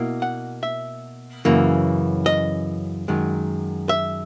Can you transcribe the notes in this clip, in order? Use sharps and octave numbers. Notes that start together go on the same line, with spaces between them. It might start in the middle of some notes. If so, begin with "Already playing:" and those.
Already playing: B2 A#3 E4
F#5
E5
F#2 C#3 E3 A#3
D#5
F#2 D#3 G#3
E5